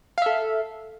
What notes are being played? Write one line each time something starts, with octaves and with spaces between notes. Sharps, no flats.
A4 E5 F5